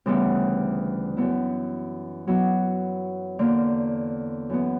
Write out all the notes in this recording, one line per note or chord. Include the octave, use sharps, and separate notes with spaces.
D2 C#3 E3 G3 B3
F#2 E3 B3 E4
F#3 B3 E4
E2 D3 A#3
F#2 E3 B3